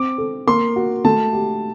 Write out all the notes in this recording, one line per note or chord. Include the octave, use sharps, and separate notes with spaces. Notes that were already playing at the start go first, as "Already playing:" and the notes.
Already playing: C4 D6
A4
A#3 C6
F#4
A3 A5
G4